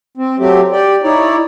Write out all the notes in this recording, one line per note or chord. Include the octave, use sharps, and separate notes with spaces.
C4
F#3 A3 C4 G4
G4 D5 G5
D#4 E4 C#5 D5